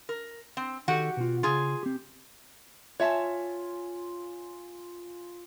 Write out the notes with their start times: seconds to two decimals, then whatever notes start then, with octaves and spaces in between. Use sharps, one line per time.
0.09 A#4
0.57 C4
0.88 D#3 F#4 G4 A4 F#5
1.17 B2 F4
1.43 C#3 F4 G#4 C6
1.83 C4 G4
3.00 F4 C#5 E5 G#5 A5